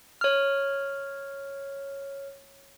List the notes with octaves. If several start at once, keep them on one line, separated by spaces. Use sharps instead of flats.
C#5 F6